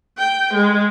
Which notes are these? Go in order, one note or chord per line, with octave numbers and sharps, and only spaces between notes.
G5
G#3